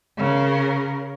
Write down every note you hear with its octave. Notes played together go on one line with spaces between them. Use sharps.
C#3 A#4